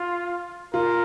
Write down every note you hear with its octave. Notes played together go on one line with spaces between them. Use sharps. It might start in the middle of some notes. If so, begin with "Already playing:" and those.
Already playing: F4
F4 A#4